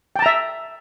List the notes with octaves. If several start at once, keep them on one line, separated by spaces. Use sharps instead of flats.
E5 G5 A5 A#5